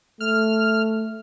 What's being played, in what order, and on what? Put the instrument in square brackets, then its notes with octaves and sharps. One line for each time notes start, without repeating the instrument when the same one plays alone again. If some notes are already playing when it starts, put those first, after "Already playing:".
[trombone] A3 [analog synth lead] F6